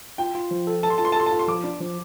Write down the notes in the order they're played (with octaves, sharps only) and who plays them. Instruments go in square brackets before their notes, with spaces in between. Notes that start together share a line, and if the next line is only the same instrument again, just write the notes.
[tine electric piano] F4 [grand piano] G5
[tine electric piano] F4
F3
A4
[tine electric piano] A4 [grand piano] A5
[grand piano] C6
[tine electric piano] F4 [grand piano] A5
[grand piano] C6
A5
[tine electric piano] A4 [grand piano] C6
[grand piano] A5
[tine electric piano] F4
[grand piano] C6
[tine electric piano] F3 [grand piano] D6
[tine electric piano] D4
F3